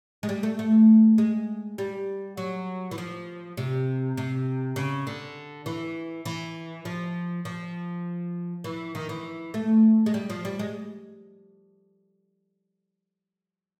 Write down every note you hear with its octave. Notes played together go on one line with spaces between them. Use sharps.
G#3
G3
A3
A3
G#3
G3
F#3
E3
F3
C3
C3
C#3
D3
E3
E3
F3
F3
E3
D#3
E3
A3
G#3
G3
F3
G3
G#3